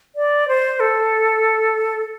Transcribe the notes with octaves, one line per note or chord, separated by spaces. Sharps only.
D5
C5
A4